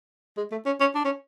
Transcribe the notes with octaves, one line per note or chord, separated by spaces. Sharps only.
G#3
A3
C#4
C#4
D4
C#4